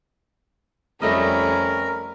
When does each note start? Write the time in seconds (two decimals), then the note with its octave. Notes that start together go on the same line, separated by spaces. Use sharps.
1.02 F2 G3 A3 C#4 A#4 D#5 B5